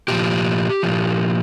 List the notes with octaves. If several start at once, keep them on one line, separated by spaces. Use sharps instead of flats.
A#2 F3 G4
A#2 F3